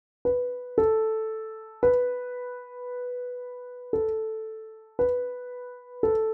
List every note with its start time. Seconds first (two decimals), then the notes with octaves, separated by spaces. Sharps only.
0.25 B4
0.78 A4
1.83 B4
3.93 A4
4.99 B4
6.03 A4